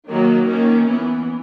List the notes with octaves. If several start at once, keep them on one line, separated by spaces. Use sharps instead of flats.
D#3 F#3 A#3
D#3 A#3 C#4
E3 B3